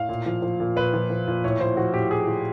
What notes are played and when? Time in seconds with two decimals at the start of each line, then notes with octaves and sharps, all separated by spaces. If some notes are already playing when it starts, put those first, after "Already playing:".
Already playing: A2 F5
0.09 A#2
0.26 F3
0.42 F3
0.60 A#2
0.76 A#2 B4
0.94 F3
1.10 F3
1.27 A#2
1.44 A2 C#5
1.60 F3 C5
1.77 F3 F#4
1.94 A2 G4
2.11 A2 G#4
2.27 F3